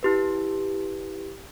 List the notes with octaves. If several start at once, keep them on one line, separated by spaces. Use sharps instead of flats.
E4 G4 B4